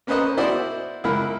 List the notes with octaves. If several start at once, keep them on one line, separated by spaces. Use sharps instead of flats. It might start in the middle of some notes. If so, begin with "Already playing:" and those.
A#3 C#4 B4 C5 D#5 A#5
E4 F#4 C5 D5 D#5
C#2 E4 A#4 B5